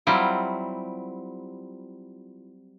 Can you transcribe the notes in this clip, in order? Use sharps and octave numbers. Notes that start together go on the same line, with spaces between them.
F#3 G3 C4 E4 F4